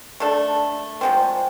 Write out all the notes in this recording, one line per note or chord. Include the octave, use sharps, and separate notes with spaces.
A3 D4 A4
F3 G#3 C4